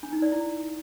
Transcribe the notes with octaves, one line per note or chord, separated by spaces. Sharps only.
D4
D#4
D5
E4